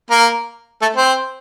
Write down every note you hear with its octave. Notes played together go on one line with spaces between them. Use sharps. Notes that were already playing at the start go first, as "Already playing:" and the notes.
A#3 A#4
A3 A4
C4 C5